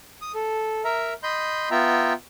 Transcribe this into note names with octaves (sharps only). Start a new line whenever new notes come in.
D#6
A4
A#4 E5 A#5
D#5 B5 C6 G6
B3 F4 E5 G5 A#5